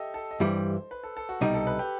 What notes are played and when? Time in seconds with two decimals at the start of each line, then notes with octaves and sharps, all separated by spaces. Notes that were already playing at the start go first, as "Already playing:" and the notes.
Already playing: G4 A4 D#5 E5
0.14 A4
0.31 D#5
0.40 G2 E3 G3 C5
0.91 B4
1.03 A4
1.17 A4
1.29 F#4
1.41 C2 B2 G3 D#4 G4
1.54 A4
1.67 B4
1.79 G4